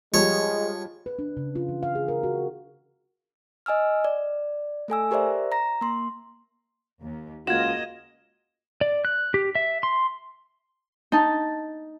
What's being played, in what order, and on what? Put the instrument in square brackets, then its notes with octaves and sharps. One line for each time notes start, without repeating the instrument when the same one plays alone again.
[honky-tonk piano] F3 G3 [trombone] G#3 [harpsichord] C#5
[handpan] B4
D4
C#3
F4
E3
F5
G#4
A#4
F#4
[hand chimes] D#5 G#5 E6 F6
D5
A3 A4 G#5 E6
G4 A#4 C5 D5 E5
A#5 A#6
A#3 C6
[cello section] D#2
[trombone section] C#2 F4 [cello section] A#3 D#5 [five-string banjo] F#4 [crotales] G#6 E7
[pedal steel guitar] D5
F#6
G4
E5
C6
[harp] D#4 A5